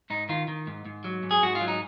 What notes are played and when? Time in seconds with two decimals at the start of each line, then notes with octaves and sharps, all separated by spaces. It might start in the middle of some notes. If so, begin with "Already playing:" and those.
0.10 G#2 D#4
0.29 D#3 F4
0.48 D#3
0.67 G#2
0.86 G#2
1.04 F#3
1.23 G#2
1.31 G#4
1.42 G#2 F#4
1.55 F4
1.61 F#3
1.68 D#4